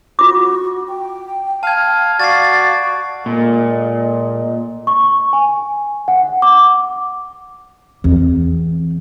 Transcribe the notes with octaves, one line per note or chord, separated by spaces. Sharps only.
F4 F#4 D6
G5
F5 A5 G#6
F#4 D5 F5 A6 C7
A#2 G#3 A4 D#5
C#6
G#5
F#5
D6
E2 C4